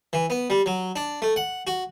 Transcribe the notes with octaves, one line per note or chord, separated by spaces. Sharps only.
E3
B3
G3
F#3
D4
A3
F#5
F#4